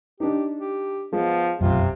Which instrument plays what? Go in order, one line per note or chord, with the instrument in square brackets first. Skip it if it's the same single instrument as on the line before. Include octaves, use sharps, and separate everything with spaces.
[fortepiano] D4 D#4 [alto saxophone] G4
[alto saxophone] G4
[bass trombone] F3 [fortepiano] G#3 [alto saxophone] B3
[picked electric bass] F1 B1 F#2 [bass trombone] C3 [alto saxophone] F4